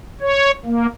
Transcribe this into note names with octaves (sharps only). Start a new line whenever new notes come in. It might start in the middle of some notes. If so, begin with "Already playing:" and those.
C#5
A#3